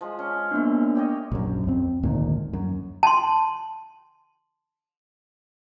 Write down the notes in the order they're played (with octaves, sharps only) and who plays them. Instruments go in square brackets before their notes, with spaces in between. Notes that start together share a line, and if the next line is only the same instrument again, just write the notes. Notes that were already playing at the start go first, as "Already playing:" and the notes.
[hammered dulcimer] F3 G#3
C#4
[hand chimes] A#3 B3 D4
[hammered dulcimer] G4 C#5 D#5
[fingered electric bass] A#1 F#2
F2 C4
G#1 D2 A#2 D#3
F#2
[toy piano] A5 C6